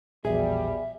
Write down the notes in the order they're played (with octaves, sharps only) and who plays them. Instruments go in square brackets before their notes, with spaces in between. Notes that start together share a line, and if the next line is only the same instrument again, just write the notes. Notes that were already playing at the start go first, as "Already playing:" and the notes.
[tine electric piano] A#1 E2 [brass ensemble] B2 G3 [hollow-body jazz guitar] G#4 [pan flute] E5